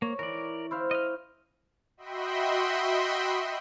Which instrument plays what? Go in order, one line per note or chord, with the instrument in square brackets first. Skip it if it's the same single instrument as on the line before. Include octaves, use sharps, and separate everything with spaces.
[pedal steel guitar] A#3 [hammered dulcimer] C#5
[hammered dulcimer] E3 [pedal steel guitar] A#4 D5
[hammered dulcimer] E4 C5 F5
[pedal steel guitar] D#5 F6
[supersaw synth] F#4 D#5 E5 G5 B5 C6